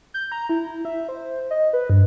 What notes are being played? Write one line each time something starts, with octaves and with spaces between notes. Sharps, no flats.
G6
A#5
E4
E5
C5
D#5
B4
G2